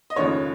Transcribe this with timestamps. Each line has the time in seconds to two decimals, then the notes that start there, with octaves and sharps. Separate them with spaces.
0.10 D#5
0.16 F1 D#2 C#3 F3 G#3 C#5